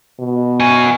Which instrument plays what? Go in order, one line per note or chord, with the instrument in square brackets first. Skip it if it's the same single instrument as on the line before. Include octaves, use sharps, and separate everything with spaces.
[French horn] B2
[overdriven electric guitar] F#4 G#5